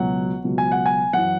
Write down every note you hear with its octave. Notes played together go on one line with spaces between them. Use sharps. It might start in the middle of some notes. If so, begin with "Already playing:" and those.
Already playing: C#2 B2 F#3 F#5
C#2 B2 F#3
G#5
F#5
G#5
F#2 E3 F#5